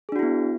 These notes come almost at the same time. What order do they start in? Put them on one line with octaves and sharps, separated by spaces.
G#4 D4 F#4 E4 B3